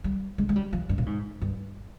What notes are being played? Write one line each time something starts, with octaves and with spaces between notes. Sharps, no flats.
G3
G#3
G#3
G3
F3
G2
A#2
G#2
G2